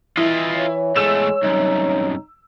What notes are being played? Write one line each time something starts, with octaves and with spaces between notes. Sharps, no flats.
E3 E4 F4 D#5
C#5
E2 G#3 A3 E6 E7
C2 F#2 D#4